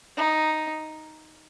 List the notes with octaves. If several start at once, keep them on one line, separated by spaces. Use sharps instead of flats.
D#4